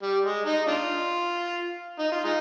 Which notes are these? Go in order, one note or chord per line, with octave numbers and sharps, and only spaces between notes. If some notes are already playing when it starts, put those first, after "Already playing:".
G3
G#3
D#4
D4 F4
D#4
F4
G#3 D#4